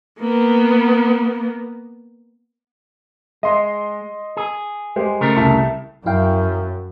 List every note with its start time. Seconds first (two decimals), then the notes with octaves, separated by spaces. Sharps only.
0.20 A#3 B3
3.43 G#3 D#5 C6
4.37 G#4
4.96 G#3 G4 C5
5.21 C#3 A3 A#4
5.36 C2 E4 A5
6.06 F#2 E4 F5 G5